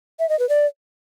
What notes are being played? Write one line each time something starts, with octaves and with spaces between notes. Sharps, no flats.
E5
D#5
B4
D5